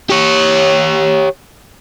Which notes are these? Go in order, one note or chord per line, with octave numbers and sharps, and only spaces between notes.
G4 C#5